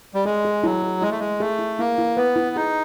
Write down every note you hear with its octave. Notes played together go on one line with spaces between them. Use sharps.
G3
G#3 G#4
G#4
F#3 E4
G#4
G#3 E4
A3
G#3 E4
A3 G#4
E4
A#3 E4
E4
B3 B4
E4
D#4 G#4